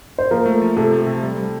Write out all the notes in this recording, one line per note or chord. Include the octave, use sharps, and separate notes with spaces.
C5
F3 A#3 A#4
A3
F3
C3 A4
A3
C3
G3
G3